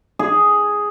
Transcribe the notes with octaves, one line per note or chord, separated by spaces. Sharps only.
G#4